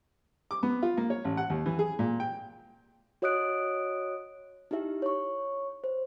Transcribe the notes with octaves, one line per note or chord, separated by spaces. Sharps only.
D6
B3
F4
A#3
C#5
A1
F#5
D#2
E3
G#4
A#2
G5
F#4 C#5 D#5 D#6 F#6 D7
D#4 E4 G4 E5
C#5 C#6
C5